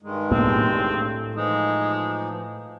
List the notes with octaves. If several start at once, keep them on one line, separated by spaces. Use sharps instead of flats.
G2 D#3 G#3
B1 A2 A#3 C4
A2
E3 F3 G#3 D#4